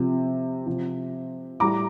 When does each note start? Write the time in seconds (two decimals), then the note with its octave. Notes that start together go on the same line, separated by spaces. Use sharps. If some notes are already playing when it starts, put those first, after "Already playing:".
Already playing: C3 F3
0.66 C3 F3
1.60 A2 G3 A#5 D6